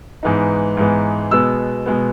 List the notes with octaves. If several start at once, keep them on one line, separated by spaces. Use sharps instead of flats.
G#2 E3 G#3 B3 D#4
G#2 E3 G#3 B3 D#4
B2 G#3 B3 E6
B2 G#3 B3